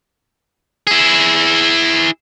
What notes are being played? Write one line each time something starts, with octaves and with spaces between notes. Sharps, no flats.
E4 G#4